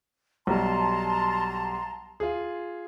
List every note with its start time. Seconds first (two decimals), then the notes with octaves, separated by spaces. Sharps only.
0.47 B1 G3 A5 A#5 C6
2.20 F4 G#4